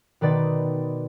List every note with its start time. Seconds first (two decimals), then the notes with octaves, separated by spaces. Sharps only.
0.21 B2 D#3 B4 D5 C6 A6